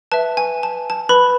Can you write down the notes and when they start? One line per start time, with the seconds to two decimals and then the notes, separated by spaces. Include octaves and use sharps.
0.12 B4 E5 A5
0.37 G#5
0.63 A5
0.90 A5
1.09 B4 B5